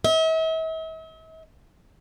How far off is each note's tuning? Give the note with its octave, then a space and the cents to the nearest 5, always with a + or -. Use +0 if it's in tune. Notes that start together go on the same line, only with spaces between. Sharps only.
E5 -45